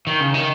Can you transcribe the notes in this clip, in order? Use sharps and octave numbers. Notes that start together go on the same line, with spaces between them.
D#3
C#3
D#3